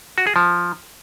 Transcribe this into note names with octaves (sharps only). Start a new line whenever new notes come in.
F#4
G#4
F3